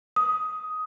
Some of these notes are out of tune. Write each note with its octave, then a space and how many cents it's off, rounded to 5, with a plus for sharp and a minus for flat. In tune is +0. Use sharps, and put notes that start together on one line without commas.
D#6 +10